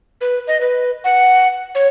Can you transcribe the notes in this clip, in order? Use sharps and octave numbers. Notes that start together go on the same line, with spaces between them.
B4
D#5
B4
F#5
C#5